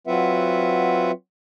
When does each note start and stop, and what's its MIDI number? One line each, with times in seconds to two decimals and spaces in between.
0.07 1.11 54
0.07 1.11 60
0.07 1.11 65
0.07 1.11 71
0.07 1.11 76
0.07 1.11 78